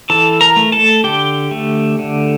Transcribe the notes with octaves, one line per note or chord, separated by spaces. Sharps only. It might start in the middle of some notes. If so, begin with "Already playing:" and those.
E3 A4 A5
A#4 A#5
A3
A4 A5
D3 G4 G5
A3
D3